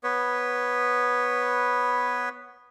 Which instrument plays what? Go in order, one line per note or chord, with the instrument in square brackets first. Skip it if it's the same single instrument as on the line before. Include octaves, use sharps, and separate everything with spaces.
[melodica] B3 B4 C#5